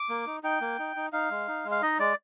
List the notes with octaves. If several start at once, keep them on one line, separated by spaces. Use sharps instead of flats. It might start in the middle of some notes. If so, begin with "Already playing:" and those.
Already playing: D6
A#3
D#4
D#4 G5
A#3
D#4
D#4
D#4 F5
G#3
D#4
G#3
F5
D#4 D#5
G#3 D5